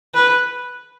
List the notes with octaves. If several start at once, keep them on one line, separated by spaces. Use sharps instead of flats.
B4